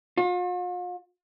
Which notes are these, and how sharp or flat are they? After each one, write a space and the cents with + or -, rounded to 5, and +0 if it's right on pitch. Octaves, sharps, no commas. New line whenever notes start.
F4 +45